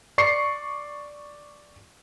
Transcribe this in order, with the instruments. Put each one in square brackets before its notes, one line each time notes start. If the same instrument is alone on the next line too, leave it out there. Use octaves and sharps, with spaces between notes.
[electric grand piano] D5 C#6 C7 C#7